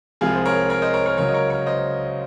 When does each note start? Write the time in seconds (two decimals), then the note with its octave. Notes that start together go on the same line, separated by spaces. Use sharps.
0.21 C2 C3 F3 G#3 F4 G#4
0.35 C5
0.45 A#4 C#5
0.70 A#4 C#5
0.82 C5 D#5
0.94 A#4 C#5
1.06 A#4 C#5
1.18 C#2 C#3 F#3 A#4 C#5
1.28 D#5
1.34 A#4 C#5
1.50 A#4 C#5
1.66 C5 D#5